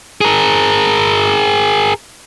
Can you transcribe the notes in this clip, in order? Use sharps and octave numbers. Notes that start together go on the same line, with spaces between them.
G#4 A#4